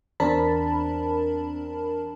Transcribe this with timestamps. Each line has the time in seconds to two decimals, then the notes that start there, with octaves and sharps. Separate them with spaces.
0.20 E2 C4 D4 A#4 A5 B5